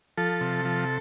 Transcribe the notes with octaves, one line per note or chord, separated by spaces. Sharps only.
F3 A4
C3
F3